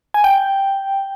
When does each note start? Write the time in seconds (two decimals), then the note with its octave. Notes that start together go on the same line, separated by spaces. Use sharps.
0.14 G#5
0.24 G5